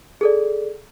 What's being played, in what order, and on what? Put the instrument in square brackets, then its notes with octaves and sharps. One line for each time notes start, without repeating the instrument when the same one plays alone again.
[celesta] G#4 A4 D5